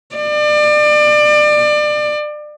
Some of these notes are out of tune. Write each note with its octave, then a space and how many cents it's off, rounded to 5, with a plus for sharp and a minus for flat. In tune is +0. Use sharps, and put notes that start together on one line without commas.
D5 +30